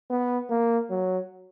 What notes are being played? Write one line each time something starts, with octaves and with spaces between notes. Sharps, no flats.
B3
A#3
F#3